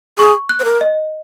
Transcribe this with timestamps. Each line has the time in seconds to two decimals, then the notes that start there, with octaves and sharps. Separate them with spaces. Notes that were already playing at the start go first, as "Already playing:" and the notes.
0.18 G#4 C#6
0.49 F#6
0.60 C5
0.64 A#4
0.81 D#5